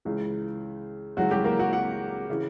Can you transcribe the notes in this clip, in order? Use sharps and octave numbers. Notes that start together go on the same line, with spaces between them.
C#2 C#3 E3
C#2 C#3 E3 F#3 F#4
G3 G4
A#3 A#4
F#4 F#5
F#4 F#5
C#3 E3